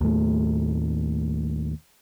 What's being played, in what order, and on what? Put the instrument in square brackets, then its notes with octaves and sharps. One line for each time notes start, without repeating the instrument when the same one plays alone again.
[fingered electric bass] D#2 A2 A3